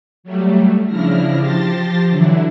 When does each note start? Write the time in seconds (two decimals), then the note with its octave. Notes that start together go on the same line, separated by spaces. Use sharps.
0.24 F#3 G3 A3
0.87 C#3 F3 D4 E4 F6 A#6
1.38 F3 G4 A5 C6 A6 A#6
2.09 D3 E3 F#3 D4 E4